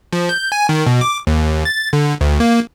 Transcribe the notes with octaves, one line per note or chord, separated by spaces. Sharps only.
F3
G6
G#5
D#3
B2
D6
D#2
A6
D3
D2
A#3